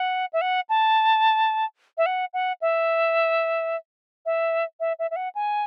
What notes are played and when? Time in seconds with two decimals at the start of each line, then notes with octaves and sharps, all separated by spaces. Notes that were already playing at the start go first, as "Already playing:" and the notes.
Already playing: F#5
0.33 E5
0.41 F#5
0.69 A5
1.98 E5
2.06 F#5
2.33 F#5
2.61 E5
4.26 E5
4.80 E5
4.99 E5
5.11 E5
5.16 F#5
5.35 G#5